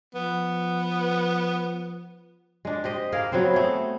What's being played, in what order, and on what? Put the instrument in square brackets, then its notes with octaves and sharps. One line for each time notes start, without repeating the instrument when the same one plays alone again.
[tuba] F3 [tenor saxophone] B3
[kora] G#3 D4
G4 C5 D#5
A#3 G#4 A#4
F#3 B3 C4 C5
A3 G#4